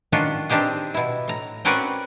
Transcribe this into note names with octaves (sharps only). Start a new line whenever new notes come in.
D#3 C#4 D4 F4 F#4
C4 D4 D#4 G4 G#4
B2 E4
A2 A#5
C4 C#4 F#4 A#4 B4 D5